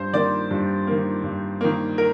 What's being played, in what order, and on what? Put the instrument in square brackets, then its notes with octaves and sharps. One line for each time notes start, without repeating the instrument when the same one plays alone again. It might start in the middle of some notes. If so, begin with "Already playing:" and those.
Already playing: [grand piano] G2 C5
D#3 A#3 D5
G2
D#3 A#3
G2
D#3 A#3
A#4